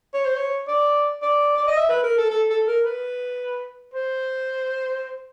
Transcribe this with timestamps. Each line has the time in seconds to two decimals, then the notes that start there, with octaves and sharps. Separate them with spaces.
0.14 C#5
0.25 C5
0.37 C#5
0.68 D5
1.22 D5
1.57 D5
1.67 D#5
1.77 E5
1.89 B4
2.03 A#4
2.17 A4
2.30 A4
2.49 A4
2.67 A#4
2.85 B4
3.94 C5